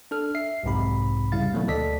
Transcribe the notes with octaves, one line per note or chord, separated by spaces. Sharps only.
D4 A4 F6
E5 C7
B1 F2 G#2 C3 B5
C#3 G3 E4 F5 A6
B2 D#3 F#3 A3 A#3
D2 A4 D5 D#5 B6